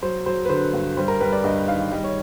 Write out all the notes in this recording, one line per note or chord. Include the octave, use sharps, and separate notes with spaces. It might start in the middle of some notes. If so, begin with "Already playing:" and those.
F#3 C5
F#3 C5
B4
D3 C5
G2
G3 C5
A#4
G3 B4
D5
G2 D#5
D#3 F5
G3 D#5
C#5